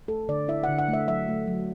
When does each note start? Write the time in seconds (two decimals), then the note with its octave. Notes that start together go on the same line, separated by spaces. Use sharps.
0.08 A3 A4
0.29 D3 D5
0.48 E4 E5
0.64 D3 F#5
0.79 F#5
0.88 A3 E5
1.08 F#3 E5
1.28 A3
1.47 F#3